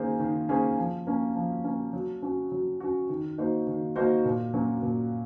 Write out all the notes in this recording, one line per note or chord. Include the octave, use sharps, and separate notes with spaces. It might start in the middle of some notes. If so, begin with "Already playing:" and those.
Already playing: D#3 A#3 C#4 G#4 C5
D#3
A#3 C#4 G#4 C5
F3
A#3 C#4
F3
A#3 C#4
F#3
C#4 F#4
F#3
C#4 F#4
D#3
A#3 D#4 F#4 C5
D#3
A#3 D#4 F#4 C5
A#2
F#3 A#3 C#4 F#4
A#2